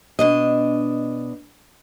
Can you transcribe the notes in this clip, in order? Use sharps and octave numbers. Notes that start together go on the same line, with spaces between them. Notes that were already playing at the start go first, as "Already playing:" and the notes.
B2 D4 D#5